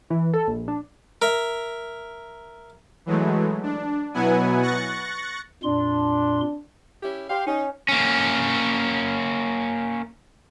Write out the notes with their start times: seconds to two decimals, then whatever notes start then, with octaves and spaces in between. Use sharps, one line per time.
0.10 E3
0.34 A4
0.48 A#1
0.68 D4
1.22 A#4 E5
3.06 E3 F#3 G#3 A3
3.63 D4
4.14 B2 F#3 B3 E4 F#5 G#5
4.62 C#6 F#6 A6 A#6 C#7
5.63 F2 A#2 D4 C6
7.03 C#4 E4 G4
7.30 G4 C5 F5
7.47 C#4 D#4
7.89 A#3 C#4